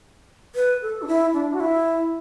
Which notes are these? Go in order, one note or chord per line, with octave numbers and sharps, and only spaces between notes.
B4
A4
D4
E4
D4
F#4
E4